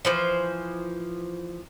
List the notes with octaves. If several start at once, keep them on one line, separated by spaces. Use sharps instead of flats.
E3 F3 C5